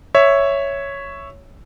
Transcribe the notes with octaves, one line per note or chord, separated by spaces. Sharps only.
C#5 E5